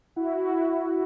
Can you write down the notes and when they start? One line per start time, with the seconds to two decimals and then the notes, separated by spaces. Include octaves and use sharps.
0.16 E4 F#4
0.33 E4